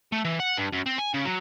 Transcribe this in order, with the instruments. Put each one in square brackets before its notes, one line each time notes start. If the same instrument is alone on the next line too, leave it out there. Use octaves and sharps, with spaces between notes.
[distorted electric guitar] A3
E3
F#5
G2
F#2
C4
G#5
C#3
F#3